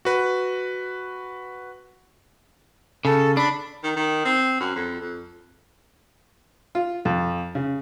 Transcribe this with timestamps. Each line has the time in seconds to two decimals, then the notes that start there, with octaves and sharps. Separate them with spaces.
0.05 F#4 B4
3.05 C#3 A4
3.37 D4 B5
3.84 D#3
3.96 D#3
4.25 C4
4.61 F#2
4.76 F2
5.01 F2
6.75 F4
7.05 F2
7.55 C#3